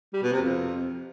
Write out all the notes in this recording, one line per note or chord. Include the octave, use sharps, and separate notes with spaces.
G3
B2
C3
F2